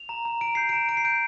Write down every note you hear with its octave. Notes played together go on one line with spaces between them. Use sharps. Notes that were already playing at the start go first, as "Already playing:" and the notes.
Already playing: F7
A#5
A#5
A#5 D7
G6 C7
A#5 D7
A#5 D7
C7
G6 D7